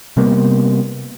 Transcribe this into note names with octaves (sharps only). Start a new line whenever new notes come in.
C3 G3 A#3 B3